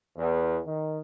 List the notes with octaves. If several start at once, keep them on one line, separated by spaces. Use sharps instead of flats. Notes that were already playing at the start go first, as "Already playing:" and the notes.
E2
D#3